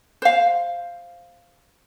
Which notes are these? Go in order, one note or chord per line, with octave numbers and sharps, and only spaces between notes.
C5 F5